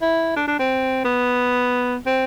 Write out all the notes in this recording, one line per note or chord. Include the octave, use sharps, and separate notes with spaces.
E4
D4
D4
C4
B3
C4